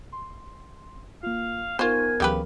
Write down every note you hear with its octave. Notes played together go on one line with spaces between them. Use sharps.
C6
A#3 F4 F5
B3 D#4 F4 A#4 C5 G#5 C#6
D2 C#3 E3 F#3 G4 B4